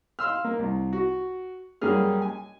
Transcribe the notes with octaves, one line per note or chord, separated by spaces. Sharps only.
F5 C6 E6 F6
A#3
C2
F#4
F#2 G3 A#3 C#4 G#4 F6
G#5